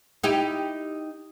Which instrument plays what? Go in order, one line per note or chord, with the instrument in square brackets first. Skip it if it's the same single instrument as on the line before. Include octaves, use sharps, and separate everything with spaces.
[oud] D#4 E4 G4